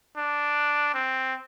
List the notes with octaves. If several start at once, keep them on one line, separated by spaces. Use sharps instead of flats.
D4
C4